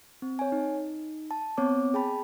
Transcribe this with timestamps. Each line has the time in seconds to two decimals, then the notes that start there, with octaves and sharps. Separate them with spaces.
0.22 C4
0.39 C#5 G#5
0.52 D#4
1.31 A5
1.57 B3 C4 C#5 D6
1.94 G#4 G5 A5 B5